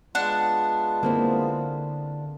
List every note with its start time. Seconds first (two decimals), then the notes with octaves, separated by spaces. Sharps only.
0.15 G#3 B3 D4 F4 F#5
1.03 D3 A#3 C4 E4